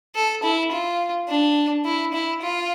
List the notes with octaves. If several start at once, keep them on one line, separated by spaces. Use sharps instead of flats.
A4
E4
F4
D4
E4
E4
F4